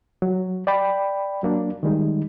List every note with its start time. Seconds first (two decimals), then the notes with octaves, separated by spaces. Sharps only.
0.22 F#3
0.67 D5 G5 B5
1.43 F#3 A#3 D4
1.83 D#3 G3 G#3 D#4